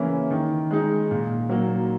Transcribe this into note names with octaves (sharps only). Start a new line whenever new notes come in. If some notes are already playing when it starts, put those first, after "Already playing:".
Already playing: C#3 E3 A#3 C#4 E4
D#3
G#3 D#4
A#2
F#3 A#3